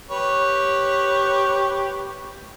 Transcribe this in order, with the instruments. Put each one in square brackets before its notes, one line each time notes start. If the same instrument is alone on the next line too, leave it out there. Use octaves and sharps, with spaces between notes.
[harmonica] G4 B4 C#5